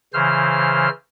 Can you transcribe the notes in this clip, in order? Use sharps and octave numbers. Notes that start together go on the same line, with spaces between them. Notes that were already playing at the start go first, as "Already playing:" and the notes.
C#3 E3 C5 F6